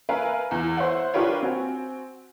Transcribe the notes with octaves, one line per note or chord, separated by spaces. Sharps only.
A#4 B4 E5 F5 G#5 A#5
E2
C5 C#5 E5 F#5
D4 F4 G4 A#4 B4 C#5
C4 F#4 G#5